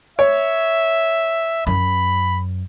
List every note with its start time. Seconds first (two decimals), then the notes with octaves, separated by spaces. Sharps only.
0.19 C#5 E5
1.67 F#2 B5